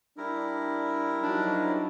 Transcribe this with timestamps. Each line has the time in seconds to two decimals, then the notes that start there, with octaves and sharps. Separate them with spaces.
0.18 G3 D4 E4 A#4
1.23 F3 F#3 D4 D#4